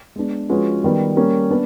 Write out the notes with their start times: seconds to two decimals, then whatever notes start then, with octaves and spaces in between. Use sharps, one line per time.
0.16 G#3 B3 D4
0.49 F3 G#3 C#4 F#4 B4
0.84 D#3 G3 B3
1.17 G3 A#3 C#4
1.51 B3 D4